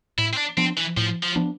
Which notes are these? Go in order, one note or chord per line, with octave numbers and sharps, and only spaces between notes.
A2 E4
C4
D4
F3 B3 C4 D4
E3
A2 F3
F3
F3 B3 D4